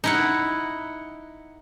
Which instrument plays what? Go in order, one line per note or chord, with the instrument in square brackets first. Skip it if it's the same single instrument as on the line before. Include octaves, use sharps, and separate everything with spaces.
[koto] D#4 E4 F#5